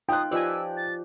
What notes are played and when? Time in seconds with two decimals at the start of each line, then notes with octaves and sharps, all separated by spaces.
0.09 D#4 F4 G5 D#6 F#6
0.31 F3 G4 B4 D5 D#5 G#5 E6
0.77 A6